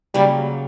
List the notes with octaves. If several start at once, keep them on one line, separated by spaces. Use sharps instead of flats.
C#3 F#3 G3 A#3